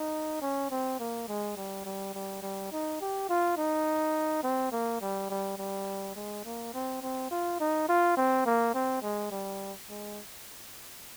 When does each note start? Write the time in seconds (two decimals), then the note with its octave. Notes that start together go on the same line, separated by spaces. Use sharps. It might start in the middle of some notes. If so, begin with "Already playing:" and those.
Already playing: D#4
0.42 C#4
0.71 C4
1.00 A#3
1.28 G#3
1.57 G3
1.85 G3
2.15 G3
2.42 G3
2.72 D#4
3.01 G4
3.29 F4
3.57 D#4
4.43 C4
4.72 A#3
5.01 G3
5.30 G3
5.58 G3
6.16 G#3
6.45 A#3
6.74 C4
7.02 C4
7.31 F4
7.60 D#4
7.89 F4
8.17 C4
8.46 A#3
8.74 C4
9.03 G#3
9.32 G3
9.90 G#3